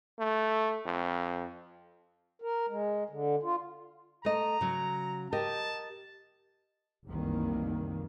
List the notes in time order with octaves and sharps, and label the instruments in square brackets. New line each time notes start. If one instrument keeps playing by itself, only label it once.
[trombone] A3
F2
[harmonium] A#4
G#3
D3
F4
[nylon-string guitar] A3 D#5 [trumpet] A#5
[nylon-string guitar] C#3 F#3
[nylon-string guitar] G4 A#4 D#5 [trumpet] A5
[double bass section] F1 C2 F#2 D#3 E3 A#3